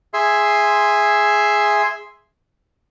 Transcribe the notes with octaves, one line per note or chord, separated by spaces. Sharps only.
G#4 E5 C6